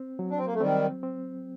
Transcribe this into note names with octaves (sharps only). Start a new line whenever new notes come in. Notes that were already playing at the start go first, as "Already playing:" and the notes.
Already playing: C4
F#3
D4
C4
A#3
A3
D#3 G3 C4
C4